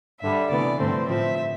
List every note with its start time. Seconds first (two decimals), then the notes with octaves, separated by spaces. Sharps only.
0.22 G2 D3 G3 E5
0.50 D2 C3 E3 B3 D5
0.79 G2 D3 F3 A3 C4 C5
1.08 A2 F3 C4 E5